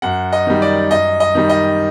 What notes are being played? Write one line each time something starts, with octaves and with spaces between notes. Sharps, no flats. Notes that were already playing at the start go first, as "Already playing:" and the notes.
F#2 F#5
D#5
D#3 G3
D5
F#2 D#5
D#5
D#3 G3
D#5